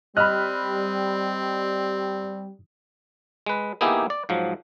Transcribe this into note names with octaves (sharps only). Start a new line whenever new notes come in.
G3 C4 D#5 B5 F6 F#6
G#3 B4
A#3 B3 D#4 E4 G4 G#4
D5
G#2 F3 F#3